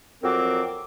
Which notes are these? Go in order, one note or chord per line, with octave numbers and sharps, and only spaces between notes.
F2 F#3 C4 A#4 D6